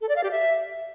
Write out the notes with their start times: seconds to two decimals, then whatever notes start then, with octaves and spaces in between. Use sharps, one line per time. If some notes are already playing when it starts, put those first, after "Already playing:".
0.01 A4
0.09 D5
0.16 F5
0.23 G4
0.31 E5